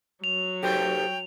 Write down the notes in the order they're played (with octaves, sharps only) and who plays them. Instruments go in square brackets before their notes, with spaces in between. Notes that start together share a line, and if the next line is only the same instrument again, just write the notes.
[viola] F#3 [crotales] F7
[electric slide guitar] G4 A4 C5 [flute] G5